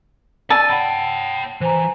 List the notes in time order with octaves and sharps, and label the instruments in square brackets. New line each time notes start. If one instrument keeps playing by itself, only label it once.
[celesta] D5 E6 [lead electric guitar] G#5 [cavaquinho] A5
[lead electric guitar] C#5 G5 [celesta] F#5 B5
[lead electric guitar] E3 [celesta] C5 G#5 A#5